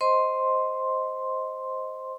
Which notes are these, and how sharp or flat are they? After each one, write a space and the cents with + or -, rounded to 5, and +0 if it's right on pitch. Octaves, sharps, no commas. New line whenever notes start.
C5 +0 D#5 +10 C6 +0